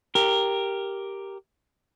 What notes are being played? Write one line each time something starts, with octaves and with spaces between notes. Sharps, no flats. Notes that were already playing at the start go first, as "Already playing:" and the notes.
G4 A#4